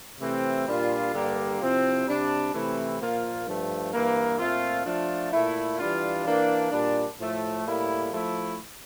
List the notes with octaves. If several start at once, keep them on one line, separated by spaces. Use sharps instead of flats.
C3 E3 A3 C4
A#2 G3 D4 F4
G2 D3 G3 A#3
C3 F3 C4 E4
C3 G3 D4
C3 E3 A3 C4 E4
A#2 F3 A#3 F4
G2 F3 A3
G2 E3 A#3
A#2 A3 C4 F4
F3 A3 D4 F4
A#2 A3 E4
E3 G3 D4 F4
E3 A#3 D4
A#2 G3 D4
A2 F3 A3
A2 G3 A#3 E4
F3 A3 E4